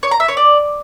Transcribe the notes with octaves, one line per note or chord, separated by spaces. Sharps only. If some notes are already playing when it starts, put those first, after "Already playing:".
C#5
A#5
E5
C#5
D5